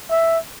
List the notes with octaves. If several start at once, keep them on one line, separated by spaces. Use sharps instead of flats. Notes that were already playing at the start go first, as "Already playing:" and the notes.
E5